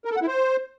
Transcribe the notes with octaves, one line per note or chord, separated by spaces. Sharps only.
A#4
A4
F#5
E4
C5